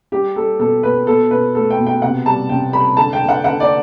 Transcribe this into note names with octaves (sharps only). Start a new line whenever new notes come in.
G3 G4
G3 A4
B2 A4
B2 B4
B2 A4
B2 B4
A3 A4
G5
B2
G5
C3 F#5
G3 A5
C3 G5
G3 B5
D3 A5
G5
D3
F#5
D3 F#5
D5